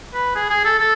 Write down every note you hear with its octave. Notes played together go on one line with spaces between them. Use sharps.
B4
G#4
G#4
A4
A4